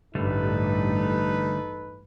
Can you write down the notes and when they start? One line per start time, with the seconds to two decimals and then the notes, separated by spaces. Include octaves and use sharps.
0.15 A1 G2 D3 G3 A3 D#4 A4 B4